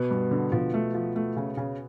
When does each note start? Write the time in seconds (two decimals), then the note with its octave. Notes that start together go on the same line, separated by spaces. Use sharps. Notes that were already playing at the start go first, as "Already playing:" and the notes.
Already playing: B2 B3
0.11 G2
0.31 D3
0.52 B2 F3 B3
0.74 A3
0.94 F3
1.16 A3
1.36 C#3
1.57 C#3